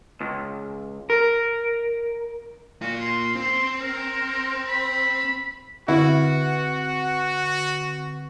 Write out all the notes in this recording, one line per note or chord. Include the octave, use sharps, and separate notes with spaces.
C#2
A#4
A#3 F4 F#4
C6
C4 C6
A#4
B5
D3 C4 E4 F#4 B4 F#5